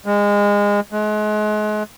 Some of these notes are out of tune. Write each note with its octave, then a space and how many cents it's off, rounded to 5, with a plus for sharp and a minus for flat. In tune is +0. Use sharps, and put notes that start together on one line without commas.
G#3 -25
G#3 +35